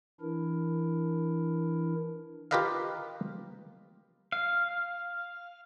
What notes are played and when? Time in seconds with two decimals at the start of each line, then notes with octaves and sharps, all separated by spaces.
0.21 E3 D4 E4 A#4
2.51 F4 G4 A#4 B4 D#5 F5
4.32 F5